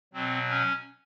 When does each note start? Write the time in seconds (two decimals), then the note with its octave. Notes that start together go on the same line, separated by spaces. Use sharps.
0.14 B2 F#3 C4
0.49 C#4